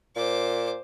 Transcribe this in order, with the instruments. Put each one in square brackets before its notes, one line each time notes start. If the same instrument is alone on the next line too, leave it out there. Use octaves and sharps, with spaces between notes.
[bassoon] A#2 [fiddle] C5 D6